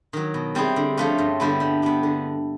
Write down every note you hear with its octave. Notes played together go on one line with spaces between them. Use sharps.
D#3 F#3
B2
G3 C4 E4 G#4
D3
F3 A3 C#4 F4
G2
D3 G3 B3 E4
G3
B3 D4 G4
D3